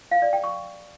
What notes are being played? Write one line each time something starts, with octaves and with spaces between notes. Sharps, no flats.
F5
D5
G5
C#6